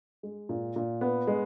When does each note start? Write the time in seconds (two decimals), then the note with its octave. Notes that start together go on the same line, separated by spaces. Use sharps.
0.23 G#3
0.49 A#2
0.76 A#2
1.01 B3
1.27 G#3